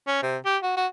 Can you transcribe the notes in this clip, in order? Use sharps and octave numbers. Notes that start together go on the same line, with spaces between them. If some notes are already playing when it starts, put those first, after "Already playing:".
C#4
C3
G4
F#4
F#4